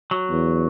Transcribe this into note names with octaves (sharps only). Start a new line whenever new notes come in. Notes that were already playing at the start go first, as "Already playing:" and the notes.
F#3
E2